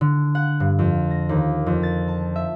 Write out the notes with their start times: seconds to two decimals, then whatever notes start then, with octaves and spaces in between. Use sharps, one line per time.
0.01 D3
0.35 F#5
0.60 G2
0.79 F2
1.11 A#6
1.29 D#2
1.66 F2
1.83 A6
2.08 A5
2.36 E5